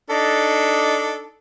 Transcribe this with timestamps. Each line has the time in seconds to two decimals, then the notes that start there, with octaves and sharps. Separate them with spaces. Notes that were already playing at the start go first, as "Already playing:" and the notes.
0.10 D4 D#4 A4